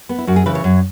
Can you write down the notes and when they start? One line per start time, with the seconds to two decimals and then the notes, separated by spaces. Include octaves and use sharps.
0.09 B3
0.18 E4
0.27 F#2 F#4
0.36 G#4
0.46 C#3 E3 B4
0.55 C#5
0.64 F#2